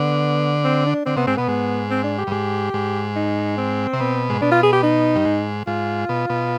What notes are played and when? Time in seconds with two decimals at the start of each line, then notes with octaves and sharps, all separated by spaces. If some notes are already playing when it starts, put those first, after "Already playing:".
Already playing: D3 B3
0.64 C4
0.86 D4
1.06 D3 C4
1.16 C3 B3
1.27 G#2 C4
1.37 B2 B3
1.48 G#2
1.90 C4
2.04 D4
2.18 G4
2.27 G2
2.31 G#2 G4
2.74 G#2
3.16 D#4
3.57 C4
3.93 C3
4.00 B2
4.30 G#2
4.41 B2 D4
4.51 F4
4.63 G#4
4.73 G4
4.83 D#4
5.15 G2
5.25 G#2
5.67 G#2 F4
6.09 B2
6.30 B2